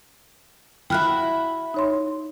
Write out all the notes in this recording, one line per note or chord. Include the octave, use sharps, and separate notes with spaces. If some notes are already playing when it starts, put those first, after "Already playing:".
E4 F#4 E5 G5 F6 F#6
D#4 C#5 C6